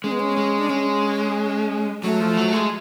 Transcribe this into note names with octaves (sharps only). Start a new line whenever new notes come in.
G#3 C#4
B3
C#4
G#3
D4
G#3 C#4
F#3 A3
F3
F#3
G#3